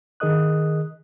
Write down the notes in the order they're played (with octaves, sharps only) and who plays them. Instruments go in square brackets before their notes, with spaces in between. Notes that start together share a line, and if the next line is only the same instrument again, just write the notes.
[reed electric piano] D#3 G#4 A#4 D#5 D#6 F#6